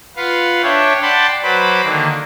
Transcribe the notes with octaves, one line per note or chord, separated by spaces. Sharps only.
F4 B4 F5 F#5
D4 C#5 E5 G5
D5 F#5 G5 A5 B5 C6
F#3 B4 C5 B5 D6
D3 D#3 A#3